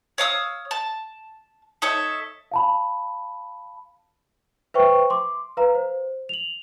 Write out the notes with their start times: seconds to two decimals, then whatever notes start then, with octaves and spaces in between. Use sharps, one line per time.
0.18 C#5 F5 D#6 E6
0.71 A5
1.82 D#4 A4 C#5 E5
2.52 F5 A5 B5
4.74 B4 C5 E5 G5 C#6
5.10 C6 D6
5.57 B4 F5 A#5
5.75 C5
6.29 F7 F#7